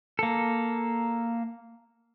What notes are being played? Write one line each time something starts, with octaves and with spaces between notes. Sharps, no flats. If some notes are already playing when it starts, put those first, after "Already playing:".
A#3 A4